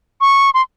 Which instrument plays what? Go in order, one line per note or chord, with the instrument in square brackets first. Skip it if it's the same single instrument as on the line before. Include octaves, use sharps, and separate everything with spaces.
[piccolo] C#6
C6